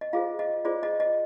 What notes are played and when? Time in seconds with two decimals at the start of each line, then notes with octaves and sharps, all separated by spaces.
0.01 D#5
0.13 F4 G#4 C5 F5
0.39 D#5
0.65 F4 G#4 C5 D5
0.83 D#5
1.00 D#5